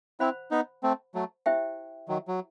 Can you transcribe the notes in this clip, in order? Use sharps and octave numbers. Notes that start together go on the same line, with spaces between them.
C4 E4 C5 F#5 B5
B3 D#4
A3 C4
F#3 A3
E4 G4 C5 E5 G5
D#3 F#3
F#3